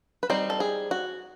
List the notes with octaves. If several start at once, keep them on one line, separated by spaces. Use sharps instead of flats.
B4
G3 C4 D#4 C5
A4
G#4
F#4